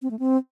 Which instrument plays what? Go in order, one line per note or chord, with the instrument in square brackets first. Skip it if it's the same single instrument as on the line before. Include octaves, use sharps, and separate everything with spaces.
[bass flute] C4
A3
C4